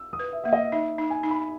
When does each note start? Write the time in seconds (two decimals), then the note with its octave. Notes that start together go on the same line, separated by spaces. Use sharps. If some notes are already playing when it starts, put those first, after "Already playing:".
Already playing: E6
0.13 D#6
0.19 B4
0.33 E5
0.44 A#3 E5
0.53 D#5
0.72 D#4 E5
0.98 D#4
1.10 G#5
1.23 D#4
1.30 B5